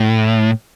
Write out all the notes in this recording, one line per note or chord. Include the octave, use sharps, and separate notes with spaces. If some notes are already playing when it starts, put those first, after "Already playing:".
Already playing: A2